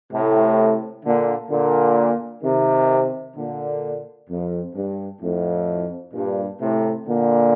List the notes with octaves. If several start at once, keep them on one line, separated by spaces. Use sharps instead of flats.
A2 C3
A#2 D3
A#2 D3
C3 D#3
A#2 D3
F2
G2
F2 A2
G2 A#2
A2 C3
A#2 D3